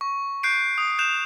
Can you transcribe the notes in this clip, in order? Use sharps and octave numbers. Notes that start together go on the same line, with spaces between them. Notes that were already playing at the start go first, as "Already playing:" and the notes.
C#6
F#6 G6 C7 D7
D#6
F#6 G6 E7 F7